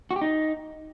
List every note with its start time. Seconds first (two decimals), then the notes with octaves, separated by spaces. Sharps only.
0.11 F#4
0.16 G4
0.21 D#4